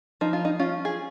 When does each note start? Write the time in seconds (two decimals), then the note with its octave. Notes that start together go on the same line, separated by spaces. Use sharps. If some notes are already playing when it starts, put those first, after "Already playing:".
0.21 F3 D#4
0.33 F4
0.45 D#4
0.60 C#4 F4
0.85 G#4